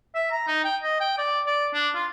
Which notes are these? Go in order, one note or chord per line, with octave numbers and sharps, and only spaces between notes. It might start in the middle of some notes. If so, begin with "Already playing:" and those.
E5
A#5
D#4
G5
D#5
G5
D5
D5
D4
F4